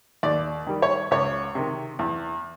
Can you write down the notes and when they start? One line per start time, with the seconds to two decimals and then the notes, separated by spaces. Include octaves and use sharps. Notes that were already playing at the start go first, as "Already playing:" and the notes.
0.23 D#2 D5
0.67 D#3 G3
0.82 C#5
1.11 C#2 C#5
1.55 C3 D#3
1.99 E2